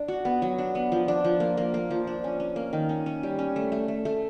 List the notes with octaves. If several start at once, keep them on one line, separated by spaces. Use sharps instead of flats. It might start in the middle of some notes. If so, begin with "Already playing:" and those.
Already playing: D4
F#4
B3
F#3
D4
B3
F3
D4
F3
A#3
A#3
A#3
F3
D4
C#4
C#4
A#3
D#3
C#4
C#4
G3
C#4
A3
A3
A3
A3